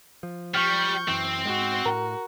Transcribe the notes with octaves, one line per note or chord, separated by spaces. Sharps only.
F3
G3 C#6 F6 G6
F#2 E3 C4
G#2 G#3 F#4
A2 A#4 A#5